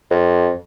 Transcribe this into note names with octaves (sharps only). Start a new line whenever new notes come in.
F2